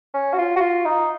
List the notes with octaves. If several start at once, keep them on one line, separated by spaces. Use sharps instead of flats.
C#4
F#4
F4
F#4
F4
D#4